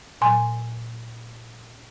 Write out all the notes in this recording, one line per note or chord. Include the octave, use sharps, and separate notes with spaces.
A#2 F#3 G#5 C6